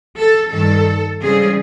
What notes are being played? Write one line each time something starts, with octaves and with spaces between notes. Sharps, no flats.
A4
G2 D#3 G3 A4
C#3 E3 G3 C4 G#4